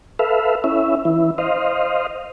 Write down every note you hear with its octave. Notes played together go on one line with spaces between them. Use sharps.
A4 B4 E5 F5
C#4 E4 E5
E3 E4
C5 D#5 F5